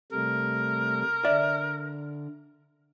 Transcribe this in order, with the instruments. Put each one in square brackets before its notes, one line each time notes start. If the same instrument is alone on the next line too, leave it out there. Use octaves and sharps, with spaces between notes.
[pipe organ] C3 G3 A3 [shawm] A#4
[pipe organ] D3 [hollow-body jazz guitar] D5 E5